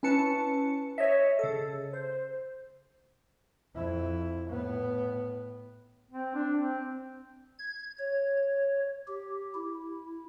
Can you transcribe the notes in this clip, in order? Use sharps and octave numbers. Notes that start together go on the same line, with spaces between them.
C#4 E4 B4 A5 C#7
C#5 D#5 E5
C#3 A4
C5
F2 E4
A2 B3
C4
D4
C4
G#6
C#5
G4
E4